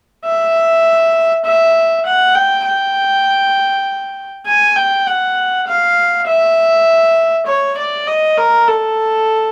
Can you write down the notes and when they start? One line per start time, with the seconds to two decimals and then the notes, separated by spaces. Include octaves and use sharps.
0.25 E5
1.45 E5
2.06 F#5
2.35 G5
2.65 G5
4.47 G#5
4.76 G5
5.06 F#5
5.67 F5
6.27 E5
7.47 C#5
7.78 D5
8.07 D#5
8.37 A#4
8.68 A4